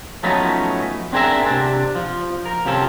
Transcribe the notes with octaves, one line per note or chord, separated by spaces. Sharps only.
F3 F#3 A3 B3 C#4 D#4
C4 D4 G#4 A#4 D5 E5
C3 D4
F3
A#4
C3 F3 C#4 A4